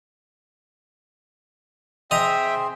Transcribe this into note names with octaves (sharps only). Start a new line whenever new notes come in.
C4 G#4 D#5 E5 G5 A#5 C6